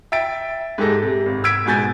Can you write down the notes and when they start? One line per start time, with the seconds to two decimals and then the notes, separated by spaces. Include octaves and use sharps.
0.12 E5 G5 A6 D7
0.78 G#2 G#3 G4 A4 A#6
1.02 C3
1.26 G#1
1.44 E6 G#6 B6 D7
1.66 G#2 B2 G#5 G6 A6